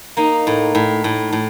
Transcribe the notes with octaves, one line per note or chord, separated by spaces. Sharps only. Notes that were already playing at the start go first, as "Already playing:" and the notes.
A#3 D#4
A2
A2
A2
A2